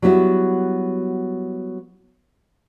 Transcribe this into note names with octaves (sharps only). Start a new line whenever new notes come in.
F#3 G3 B3 E4 F#4